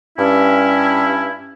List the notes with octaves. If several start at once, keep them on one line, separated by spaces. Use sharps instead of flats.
G2 C#4 E4